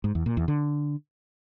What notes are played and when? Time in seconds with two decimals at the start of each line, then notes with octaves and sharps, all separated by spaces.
0.04 G#2
0.15 E2
0.26 A#2
0.37 E2
0.48 D3